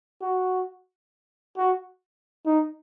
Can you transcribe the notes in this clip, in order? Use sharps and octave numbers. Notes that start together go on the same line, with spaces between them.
F#4
F#4
D#4